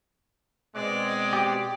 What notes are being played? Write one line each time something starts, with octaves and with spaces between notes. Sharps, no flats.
B2 G#3 C4 D5
G4